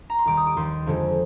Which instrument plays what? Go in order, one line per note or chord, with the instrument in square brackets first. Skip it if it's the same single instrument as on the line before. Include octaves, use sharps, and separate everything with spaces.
[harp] A#5
C6
D#2 D#3 G3 D6
D#6
D6
D#2 D#3 G3 C6
F2 D3 F3 G#3